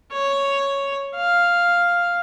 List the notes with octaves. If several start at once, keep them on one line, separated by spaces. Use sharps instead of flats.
C#5
F5